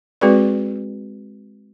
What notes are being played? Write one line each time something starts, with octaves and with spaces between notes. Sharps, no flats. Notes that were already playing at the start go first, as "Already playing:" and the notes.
G#3 C4 F#4 G#4 B4 D5